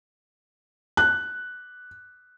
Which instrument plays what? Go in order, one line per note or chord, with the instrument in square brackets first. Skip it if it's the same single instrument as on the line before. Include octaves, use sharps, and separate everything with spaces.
[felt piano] F#6